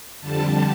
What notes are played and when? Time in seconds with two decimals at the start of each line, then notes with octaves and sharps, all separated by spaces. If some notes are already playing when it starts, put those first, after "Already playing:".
0.21 F2 D3 G3 A5